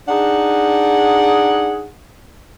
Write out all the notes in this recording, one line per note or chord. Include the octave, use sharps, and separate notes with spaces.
D4 D#4 G#4 F#5